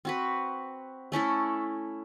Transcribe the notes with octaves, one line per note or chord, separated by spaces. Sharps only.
C4 F#4 B4
A3 C#4 E4 A4